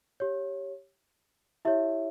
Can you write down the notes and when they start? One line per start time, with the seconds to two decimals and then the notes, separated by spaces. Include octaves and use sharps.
0.20 G4 C#5
1.65 E4 G4 C#5 E5